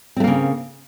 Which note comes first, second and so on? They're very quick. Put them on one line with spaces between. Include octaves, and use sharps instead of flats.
C4 A3 A#3 C#3